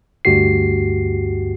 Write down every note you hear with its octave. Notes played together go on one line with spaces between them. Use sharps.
D2 G2 F#4 G4 C7